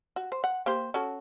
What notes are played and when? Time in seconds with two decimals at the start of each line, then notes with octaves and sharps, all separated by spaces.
0.16 F#4
0.32 C5
0.44 F#5
0.66 A#3 G4 C5
0.94 C#4 F#4 A4